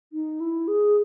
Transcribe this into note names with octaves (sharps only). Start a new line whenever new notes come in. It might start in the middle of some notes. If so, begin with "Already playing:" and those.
D#4
E4
G#4